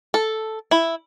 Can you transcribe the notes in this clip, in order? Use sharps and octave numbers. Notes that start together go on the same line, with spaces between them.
A4
E4